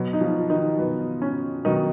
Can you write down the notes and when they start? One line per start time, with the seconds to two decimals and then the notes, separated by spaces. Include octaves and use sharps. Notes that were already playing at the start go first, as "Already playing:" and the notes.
Already playing: B2 F#3
0.13 D#4
0.21 F3 F4
0.50 D#3 D#4
0.78 B2 F#3 B3
1.22 C#4
1.65 B2 D#3 F#3 D#4